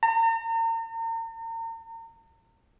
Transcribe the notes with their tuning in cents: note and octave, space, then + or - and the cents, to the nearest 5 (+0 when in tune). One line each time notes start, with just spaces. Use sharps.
A#5 -40